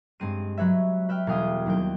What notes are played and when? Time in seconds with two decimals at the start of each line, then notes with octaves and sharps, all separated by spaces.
0.20 G2 G#3 C4 D#7
0.57 F#3 B4 C#5 E5
1.09 B4 E5 G5 F6
1.27 E1 G3 G#4 F5 G5 D#6
1.66 D#2 F#3 C4 G5